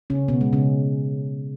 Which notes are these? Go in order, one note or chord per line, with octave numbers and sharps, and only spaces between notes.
C#3 C#4
B2 B3
G#3
C#3 C#4